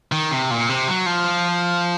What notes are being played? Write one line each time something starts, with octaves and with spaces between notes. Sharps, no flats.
D#3
C3
A#2
C3
F#3
F3